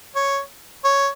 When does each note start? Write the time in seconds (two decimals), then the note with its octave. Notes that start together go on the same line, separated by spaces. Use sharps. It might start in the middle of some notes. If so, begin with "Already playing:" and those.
0.15 C#5
0.85 C#5